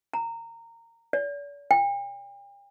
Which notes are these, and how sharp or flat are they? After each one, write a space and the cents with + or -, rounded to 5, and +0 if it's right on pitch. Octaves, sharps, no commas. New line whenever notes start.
A#5 -20
D5 -45
G5 +40